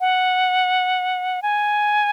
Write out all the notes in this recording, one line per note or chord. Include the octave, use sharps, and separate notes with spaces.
F#5
G#5